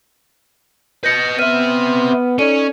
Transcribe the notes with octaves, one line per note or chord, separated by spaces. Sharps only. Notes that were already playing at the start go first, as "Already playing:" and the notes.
B4 D#5 G6 A#6 C#7
B3 C4 E5 F6 D#7
C#4 D#4 A4 C#5 D5 D#7